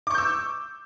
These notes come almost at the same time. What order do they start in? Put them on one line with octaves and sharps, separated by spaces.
D6 C#6 G6 E6